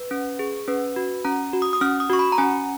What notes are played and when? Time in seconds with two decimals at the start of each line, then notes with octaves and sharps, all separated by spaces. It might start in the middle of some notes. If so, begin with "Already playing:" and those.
Already playing: B4
0.11 C#4
0.39 G#4
0.68 C#4 B4
0.96 F#4
1.25 C#4 A#5
1.53 F#4
1.62 D#6
1.73 D#6
1.81 C#4 F6
2.00 D#6
2.10 F#4 C#6
2.19 B5
2.32 A#5
2.38 C#4 G#5